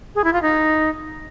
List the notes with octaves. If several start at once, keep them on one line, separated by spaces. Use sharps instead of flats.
G#4
E4
F4
D#4